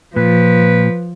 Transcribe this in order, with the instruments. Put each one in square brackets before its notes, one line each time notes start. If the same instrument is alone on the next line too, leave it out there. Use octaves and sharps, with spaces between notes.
[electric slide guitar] A#2 [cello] F3 [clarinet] B4